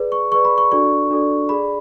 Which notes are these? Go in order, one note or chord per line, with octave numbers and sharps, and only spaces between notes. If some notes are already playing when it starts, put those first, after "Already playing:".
Already playing: G#4 B4 D5
C#6
G#4 B4 D5 C#6
B5
C#6
D4 F#4 A4 D5 C#6
D4 F#4 A4 D5
G#4 D5 B5